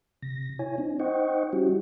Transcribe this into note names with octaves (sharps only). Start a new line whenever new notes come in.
C3 A#6
E4 C#5 G#5
C4 D4 D#4
D#4 C5 D#5 F#5 G5 C#6
G3 C#4 E4 F#4 G4